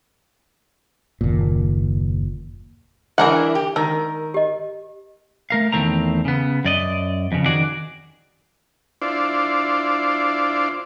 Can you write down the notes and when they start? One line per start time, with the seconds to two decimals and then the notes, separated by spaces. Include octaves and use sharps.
1.21 F#1 D#2 A#2
3.18 E3 D4 E4 G#4 A#4 E5 F#5
3.55 G4
3.76 D#3 A#4 A#5 E6
4.34 G4 D#5
5.50 A3 A#4 F5
5.72 E2 D#3 A3 C4 A#5
6.25 C#3 B3
6.64 F#2 D5 D#5
7.32 F2 C#3
7.45 D#3 F#4 G#4 D5
9.02 D4 E4 F4 C5 D5